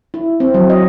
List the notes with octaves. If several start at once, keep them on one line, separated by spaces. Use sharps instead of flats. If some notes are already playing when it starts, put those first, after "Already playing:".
E4
C4
F#3
D#5